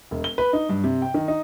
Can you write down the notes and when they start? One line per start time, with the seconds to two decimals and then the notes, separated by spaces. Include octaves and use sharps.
0.11 E1
0.24 G7
0.38 B4
0.53 D#4
0.69 G2
0.84 C3
1.02 G5
1.14 D#3
1.28 D#4